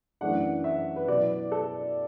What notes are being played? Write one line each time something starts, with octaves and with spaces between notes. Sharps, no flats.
F#2 E3 A3 D4 F#5
E5
B4
B2 F#3 B3 E4 D5
A4